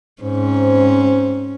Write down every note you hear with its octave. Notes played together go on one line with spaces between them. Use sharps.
G#2 C4 C#4